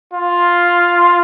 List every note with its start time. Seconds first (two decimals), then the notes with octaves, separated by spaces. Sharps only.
0.13 F4